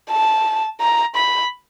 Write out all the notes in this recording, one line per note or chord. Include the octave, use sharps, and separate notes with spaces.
A5
A#5
B5